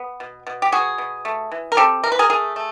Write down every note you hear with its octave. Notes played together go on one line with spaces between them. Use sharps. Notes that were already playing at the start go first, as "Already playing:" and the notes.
Already playing: B3
B2
B2
G4
B3 F#4 G#4
B2
A3
E3
A#4
C4 G4 A4
E3 A#4
B4
G#4 A#4
A3 G#4 A#4
A3